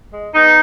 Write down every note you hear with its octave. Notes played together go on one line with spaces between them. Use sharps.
G#3
G#3 B3 D#4